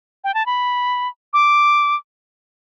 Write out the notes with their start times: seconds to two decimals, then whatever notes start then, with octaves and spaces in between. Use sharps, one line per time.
0.24 G5
0.34 A5
0.46 B5
1.34 D6